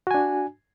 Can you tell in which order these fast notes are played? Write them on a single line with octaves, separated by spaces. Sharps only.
F#4 G#5 D4